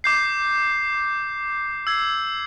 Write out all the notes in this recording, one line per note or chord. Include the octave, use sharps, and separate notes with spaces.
D6 G6 C7
E6 G#6 C7